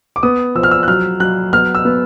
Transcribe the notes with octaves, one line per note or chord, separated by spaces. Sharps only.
D6
B3 D#6
F3 E6
F6
E6
F#6
F#3 F6
F#3 F#6
B3 F6
E6
B3